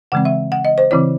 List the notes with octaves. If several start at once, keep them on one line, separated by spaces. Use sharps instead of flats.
C#3 E3 G#3 C4 F#5
E5
F#5
D#5
C5
C#3 E3 C4 E4 C#5